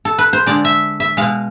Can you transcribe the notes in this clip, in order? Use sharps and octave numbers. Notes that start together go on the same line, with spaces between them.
A4
B4
C5
D3 G#3 D5
E5
E5
B2 G#3 F5